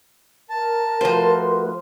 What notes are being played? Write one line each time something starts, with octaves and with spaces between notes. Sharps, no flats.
A#4 A5
F3 A3 F#4 B4 C5